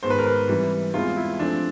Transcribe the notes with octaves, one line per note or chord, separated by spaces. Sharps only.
G#2 D#3 G#3 B3 C5
B4
A#4
B4
C3 E3 G3
E2 C3 E3 G#3 B3 F4
E4
C3 F3 A3 C4 D4